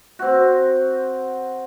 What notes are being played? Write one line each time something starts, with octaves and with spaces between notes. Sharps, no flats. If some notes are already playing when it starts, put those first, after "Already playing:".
C4 F#4